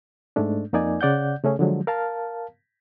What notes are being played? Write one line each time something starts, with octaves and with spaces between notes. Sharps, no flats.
G#2 G#3 A3 D4
F2 A#3 D#4 D5 G#5
C#3 D5 F#5 G6
C#3 A3 C#4 G#4
D3 F3 F#3 G#3
A#4 F5 A5